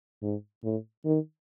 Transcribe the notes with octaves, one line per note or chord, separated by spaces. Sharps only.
G#2
A2
D#3